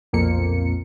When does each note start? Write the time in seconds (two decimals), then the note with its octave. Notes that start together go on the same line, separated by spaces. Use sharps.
0.13 B1 F2 A#2 A#3 C4 C#7